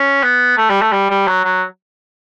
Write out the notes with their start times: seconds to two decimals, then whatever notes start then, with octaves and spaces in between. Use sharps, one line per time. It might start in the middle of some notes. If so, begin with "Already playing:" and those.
Already playing: C#4
0.23 B3
0.58 A3
0.70 G3
0.81 A3
0.92 G3
1.10 G3
1.27 F#3
1.44 F#3